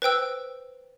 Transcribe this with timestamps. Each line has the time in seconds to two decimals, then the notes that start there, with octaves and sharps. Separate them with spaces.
0.02 B4 C5 G5 E6